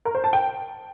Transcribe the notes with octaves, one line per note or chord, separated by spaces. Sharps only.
A#4
C5
A5
G5